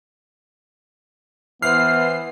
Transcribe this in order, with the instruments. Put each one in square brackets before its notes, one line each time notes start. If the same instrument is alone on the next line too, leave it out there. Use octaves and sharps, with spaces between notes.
[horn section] E3 C5 [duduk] B3 [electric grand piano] F6 [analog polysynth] C7